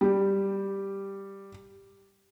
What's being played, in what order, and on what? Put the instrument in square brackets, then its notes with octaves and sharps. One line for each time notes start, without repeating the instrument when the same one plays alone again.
[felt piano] G3 G4